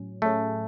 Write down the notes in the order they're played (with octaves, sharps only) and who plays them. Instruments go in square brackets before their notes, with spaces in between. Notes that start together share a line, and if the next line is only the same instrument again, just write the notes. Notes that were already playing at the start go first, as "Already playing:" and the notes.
Already playing: [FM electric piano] A2 F#3 C#4
[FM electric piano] A2 F#3 C#4 G#4 [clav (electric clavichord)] A3